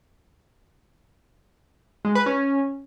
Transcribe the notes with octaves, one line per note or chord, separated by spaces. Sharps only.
G#3
B4
C#4